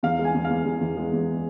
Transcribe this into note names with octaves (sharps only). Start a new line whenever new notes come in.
E2 F5
G#3
G#5
E2
F5
E2
E2
E2
G#3
E2